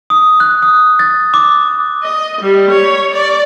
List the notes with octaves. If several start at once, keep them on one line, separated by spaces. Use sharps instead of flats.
D#6
F#6
D#6
A6
D6
D#5
G3
C#5
D5